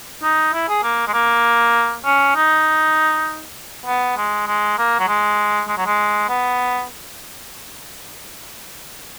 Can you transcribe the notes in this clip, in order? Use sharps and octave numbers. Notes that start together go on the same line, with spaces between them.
D#4
E4
G#4
A#3
G#3
A#3
C#4
D#4
B3
G#3
G#3
A#3
F#3
G#3
G#3
F#3
G#3
B3